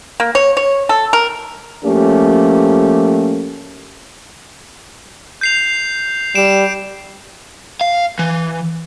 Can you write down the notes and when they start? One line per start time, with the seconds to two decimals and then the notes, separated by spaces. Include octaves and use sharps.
0.20 A#3
0.35 C#5
0.57 C#5
0.89 A4
1.13 A#4
1.83 F3 A3 A#3 C#4 G4
5.41 G6 C7 F7
6.35 G3 D7 E7
7.81 F5
8.19 E3